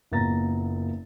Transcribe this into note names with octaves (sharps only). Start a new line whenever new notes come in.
F#1 A#2 B3 A#5 A6 A#6